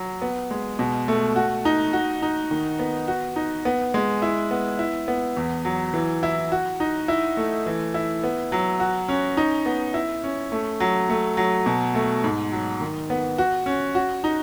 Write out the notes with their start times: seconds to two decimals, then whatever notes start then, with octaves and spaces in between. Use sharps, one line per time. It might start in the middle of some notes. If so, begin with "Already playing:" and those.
Already playing: F#3
0.22 B3
0.51 G#3
0.79 B2
1.08 A3
1.36 F#4
1.65 D#4
1.93 F#4
2.22 D#4
2.51 D#3
2.79 B3
3.08 F#4
3.36 D#4
3.65 B3
3.94 G#3
4.22 E4
4.51 B3
4.79 E4
5.08 B3
5.37 E2
5.65 F#3
5.94 E3
6.23 E4
6.52 F#4
6.80 D#4
7.08 E4
7.37 A3
7.66 E3
7.94 E4
8.24 B3
8.52 F#3
8.80 F#4
9.08 C#4
9.37 D#4
9.66 B3
9.94 E4
10.24 C#4
10.52 A3
10.80 F#3
11.09 A3
11.37 F#3
11.66 B2
11.95 A3
12.24 G#2
12.52 F#3
12.81 D#3
13.10 B3
13.38 F#4
13.66 C#4
13.95 F#4
14.24 D#4